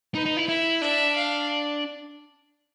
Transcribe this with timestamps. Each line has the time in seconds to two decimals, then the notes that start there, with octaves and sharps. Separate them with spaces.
0.14 D#4 B4
0.26 D#4
0.37 E4
0.48 E4 E5
0.82 D4 E5
1.16 F5